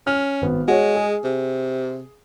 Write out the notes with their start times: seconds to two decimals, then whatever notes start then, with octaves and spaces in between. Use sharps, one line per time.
0.07 C#4 F6
0.42 G#1 B3
0.68 G#3 F#4 C#5
0.95 G#4
1.24 C3